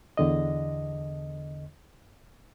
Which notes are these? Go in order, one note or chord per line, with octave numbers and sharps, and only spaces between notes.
E2 D3 D#5